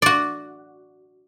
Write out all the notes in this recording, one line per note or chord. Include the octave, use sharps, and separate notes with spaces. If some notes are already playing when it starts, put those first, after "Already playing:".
F#4 D5